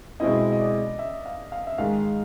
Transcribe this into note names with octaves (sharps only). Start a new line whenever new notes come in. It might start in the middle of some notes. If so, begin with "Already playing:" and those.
B2 G#3 C4 E4 D#5
D#5
D5
E5
F5
F5
E5
G#2 D#3 G#3 F5